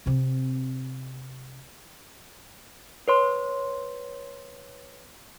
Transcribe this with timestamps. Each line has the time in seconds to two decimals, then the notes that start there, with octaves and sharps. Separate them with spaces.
0.06 C3 C4
3.08 B4 C#5 C6